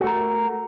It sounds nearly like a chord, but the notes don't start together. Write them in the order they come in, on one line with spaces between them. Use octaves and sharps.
F#4 A3 A#4